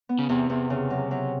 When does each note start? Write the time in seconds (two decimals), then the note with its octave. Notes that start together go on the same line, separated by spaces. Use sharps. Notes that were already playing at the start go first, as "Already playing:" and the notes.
0.09 B3
0.19 C#3
0.29 E2 C3
0.50 E2
0.70 C#3
0.90 F#3
1.11 F#3